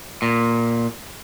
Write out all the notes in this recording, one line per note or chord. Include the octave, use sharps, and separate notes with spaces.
A#2